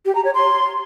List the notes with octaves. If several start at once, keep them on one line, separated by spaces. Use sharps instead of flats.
G4
A#5
C#5
C6